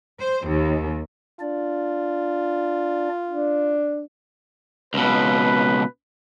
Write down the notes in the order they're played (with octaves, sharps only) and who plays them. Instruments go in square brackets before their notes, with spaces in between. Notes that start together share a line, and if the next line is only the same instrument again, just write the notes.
[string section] C5
D#2
[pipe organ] D4 D5 [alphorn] F4
[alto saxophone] D4
[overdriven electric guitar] C#2 B2 [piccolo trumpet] B4